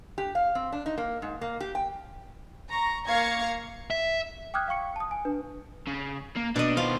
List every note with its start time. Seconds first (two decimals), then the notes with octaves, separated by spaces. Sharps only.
0.18 G4
0.35 F5
0.55 C4
0.72 D4
0.86 D#4
0.98 A#3
1.22 G#2
1.41 A#3
1.60 G4
1.75 G5
2.69 A#5 C#6
3.07 A#3 F5 A#5 C#6 G#6 C#7
3.91 E5
4.54 G5 D6 D#6 F6 F#6 G#6
4.68 F5 G5 C#6 C#7
4.96 A5 D#6
5.11 G#5
5.25 D4 B4
5.87 C#3
6.36 A#3
6.56 B2 D4 D#5
6.77 D#3 F4 C5